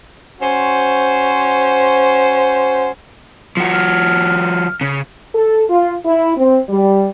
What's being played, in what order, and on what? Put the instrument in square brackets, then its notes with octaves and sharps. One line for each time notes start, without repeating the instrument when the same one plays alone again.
[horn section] C#4 F#4 C5
[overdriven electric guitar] F3 F#4
[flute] F6
[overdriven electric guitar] C#3
[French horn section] A4
F4
E4
C4
G3